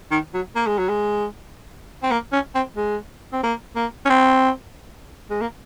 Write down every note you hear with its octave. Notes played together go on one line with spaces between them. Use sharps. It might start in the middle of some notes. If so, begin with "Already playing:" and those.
D#3
F#3
A#3
G#3
F#3
G#3
C4
A#3
C#4
C4
G#3
C4
A#3
A#3
C#4
C4
G#3
A#3